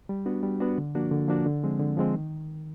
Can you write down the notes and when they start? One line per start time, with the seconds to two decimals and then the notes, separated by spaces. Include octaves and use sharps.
0.09 G3
0.26 B3 D4 F#4
0.43 G3
0.60 B3 D4 F#4
0.78 D3
0.95 F3 A#3 D4 F#4
1.11 D3
1.28 F3 A#3 D4 F#4
1.46 D3
1.63 F3 G#3 C4
1.80 D3
1.97 F3 G#3 C4
2.14 D#3